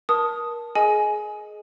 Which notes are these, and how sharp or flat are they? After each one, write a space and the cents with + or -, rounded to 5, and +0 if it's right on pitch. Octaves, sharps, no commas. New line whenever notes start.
A#4 +25 A5 +0 D#6 +0
G#4 +25 D#5 +0 G#5 +15